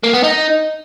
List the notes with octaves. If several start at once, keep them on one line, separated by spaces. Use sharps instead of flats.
A#3
B3
D#4